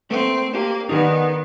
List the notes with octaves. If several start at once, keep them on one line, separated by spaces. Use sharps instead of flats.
A3 A#3 C4
A#3 G4
D#3 B3 D#4 G#4 D5